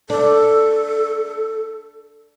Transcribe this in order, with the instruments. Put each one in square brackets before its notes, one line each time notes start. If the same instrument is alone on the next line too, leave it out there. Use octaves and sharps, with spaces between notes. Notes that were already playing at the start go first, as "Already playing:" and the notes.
[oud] D4 [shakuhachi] A4